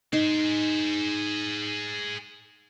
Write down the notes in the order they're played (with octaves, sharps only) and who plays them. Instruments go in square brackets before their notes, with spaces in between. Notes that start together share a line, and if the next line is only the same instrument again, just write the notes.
[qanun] D#4 [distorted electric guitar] G#4 C5